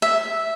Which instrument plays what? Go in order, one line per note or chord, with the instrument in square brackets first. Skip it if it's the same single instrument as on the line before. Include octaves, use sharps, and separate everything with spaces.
[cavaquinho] E5